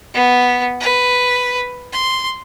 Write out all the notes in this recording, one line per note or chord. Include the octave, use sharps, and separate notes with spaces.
B3
B4
C6